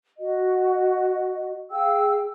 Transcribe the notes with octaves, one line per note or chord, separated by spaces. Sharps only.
F#4 D#5
G#4 F5 G5 E6